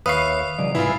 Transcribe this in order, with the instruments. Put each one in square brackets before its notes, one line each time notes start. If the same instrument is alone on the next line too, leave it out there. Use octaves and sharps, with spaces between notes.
[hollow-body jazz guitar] D#2 [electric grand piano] B4 F5 C#6 [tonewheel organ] C#5 E5 [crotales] D#6 C7
[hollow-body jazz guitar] C#3 E3 F#3 [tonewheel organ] D5 D#5
[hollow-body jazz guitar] C2 G#2 B5 [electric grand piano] E4 F4 [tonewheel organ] B4 G#5 E6